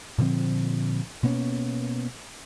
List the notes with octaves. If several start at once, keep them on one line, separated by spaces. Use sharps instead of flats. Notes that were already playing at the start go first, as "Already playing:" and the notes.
A#2 D3 F3 C4
B2 A#3 B3 C#4